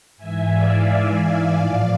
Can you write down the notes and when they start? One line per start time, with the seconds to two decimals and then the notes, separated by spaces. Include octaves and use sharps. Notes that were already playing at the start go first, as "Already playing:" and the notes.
0.17 G#2 E3 E5 G#5
0.51 D5 F5
1.51 A2 F3